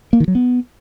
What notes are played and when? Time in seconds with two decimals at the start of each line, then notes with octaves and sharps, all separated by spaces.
0.13 A#3
0.20 D#3
0.28 F#3
0.35 B3